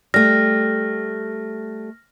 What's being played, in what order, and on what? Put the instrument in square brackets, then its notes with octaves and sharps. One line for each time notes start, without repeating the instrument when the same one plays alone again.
[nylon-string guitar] G3 A3 [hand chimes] F6 A#6